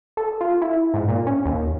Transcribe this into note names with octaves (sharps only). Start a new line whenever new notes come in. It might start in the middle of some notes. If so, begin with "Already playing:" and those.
A4
F4
E4
G#2
A#2
C#4
D#2